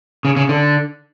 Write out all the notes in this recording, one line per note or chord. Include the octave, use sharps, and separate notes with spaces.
C#3
C#3
D3